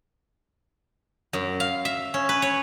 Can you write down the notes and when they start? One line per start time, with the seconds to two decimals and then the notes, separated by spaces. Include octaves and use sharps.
1.33 F#2
1.60 F5
1.85 E5
2.14 C#4
2.29 B4
2.42 C#5